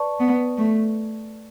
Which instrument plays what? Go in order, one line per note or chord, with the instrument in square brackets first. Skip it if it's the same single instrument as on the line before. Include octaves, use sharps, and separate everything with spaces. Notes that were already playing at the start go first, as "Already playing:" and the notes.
Already playing: [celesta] B4 D5 A5 C#6
[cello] B3
A3